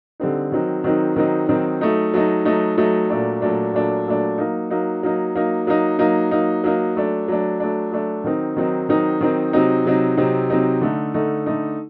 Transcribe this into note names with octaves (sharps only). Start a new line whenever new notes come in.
D3 G3 C4 D#4
D#3 F#3 C4 D#4
D#3 F#3 C4 D#4
D#3 F#3 C4 D#4
D#3 F#3 C4 D#4
F#3 A3 D#4
F#3 A3 D#4
F#3 A3 D#4
F#3 A3 D#4
A#2 F#3 A3 D4
A#2 F#3 A3 D4
A#2 F#3 A3 D4
A#2 F#3 A3 D4
F#3 A#3 D#4
F#3 A#3 D#4
F#3 A#3 D#4
F#3 A#3 D#4
F#3 A#3 D#4
F#3 A#3 D#4
F#3 A#3 D#4
F#3 A#3 D#4
F#3 A3 D4
F#3 A3 D4
F#3 A3 D4
F#3 A3 D4
D#3 F#3 C4 D#4
D#3 F#3 C4 D#4
D#3 F#3 C4 D#4
D#3 F#3 C4 D#4
C3 F#3 C4 D#4
C3 F#3 C4 D#4
C3 F#3 C4 D#4
C3 F#3 C4 D#4
D3 A3 D#4
D3 A3 D#4
D3 A3 D#4